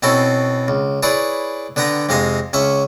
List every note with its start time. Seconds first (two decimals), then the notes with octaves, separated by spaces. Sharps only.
0.03 B2 C4 C#4 E4 A4
0.68 C#2
1.03 E4 G#4 B4 C#5 D5
1.76 D3 B3 B4 G5 A#5
2.09 F2 C3 G#3 D#4 F5 G#5
2.53 C#2 C#4 E5 C#6